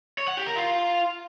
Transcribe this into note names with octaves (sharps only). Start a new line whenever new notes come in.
C#5
F#5
G4
A#4
F4